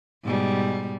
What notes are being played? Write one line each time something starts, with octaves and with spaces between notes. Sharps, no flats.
G#2 B2 G3